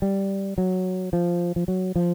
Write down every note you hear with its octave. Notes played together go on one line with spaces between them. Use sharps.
G3
F#3
F3
F3
F#3
F3